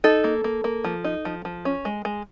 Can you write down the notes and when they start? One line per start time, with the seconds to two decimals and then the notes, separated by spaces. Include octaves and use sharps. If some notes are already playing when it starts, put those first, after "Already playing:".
0.04 D#4 A4
0.24 A#3
0.44 A#3
0.64 A#3
0.84 F3
1.04 D#4
1.25 F3
1.45 F3
1.65 C#4
1.85 G#3
2.05 G#3